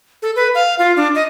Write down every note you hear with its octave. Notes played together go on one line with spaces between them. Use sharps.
A4
B4
F5
F4
D4
D#5